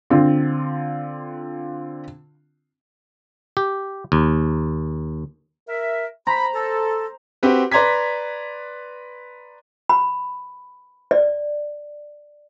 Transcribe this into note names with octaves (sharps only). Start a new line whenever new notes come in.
D3 C4 F4
G4
D#2
A#4 E5
C5 A#5 B5
A4
C4 F#4 G4 B4
B4 D5 A#5 C6 G#6 B6
B5
D5